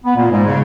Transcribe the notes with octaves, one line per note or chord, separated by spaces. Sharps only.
B3
A#2 A#3
G#2 G#3
C#3